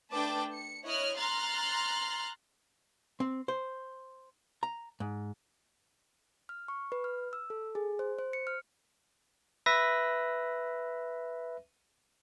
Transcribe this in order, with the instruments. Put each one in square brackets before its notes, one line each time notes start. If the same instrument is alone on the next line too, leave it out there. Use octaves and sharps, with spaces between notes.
[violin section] A3 D4 B4 G5 A5 D6
C#7
E4 C#5 D#5 F6 F#6
A#5 C6 F6 F#6 A6
[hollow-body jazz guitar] C4
C5
A#5
G#2
[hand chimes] F6
C#6
B4
F6
E6
A4
G#4
C5
C5
C#7
F6
[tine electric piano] B4 E5 A#6